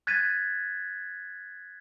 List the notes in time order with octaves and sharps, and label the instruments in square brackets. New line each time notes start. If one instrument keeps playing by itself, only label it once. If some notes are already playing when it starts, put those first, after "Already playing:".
[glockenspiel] F#6 G#6 A6 B6 D#7